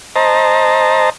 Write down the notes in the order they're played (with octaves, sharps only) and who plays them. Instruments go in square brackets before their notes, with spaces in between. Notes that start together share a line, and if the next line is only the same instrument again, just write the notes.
[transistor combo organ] C5 D#5 A5 A#5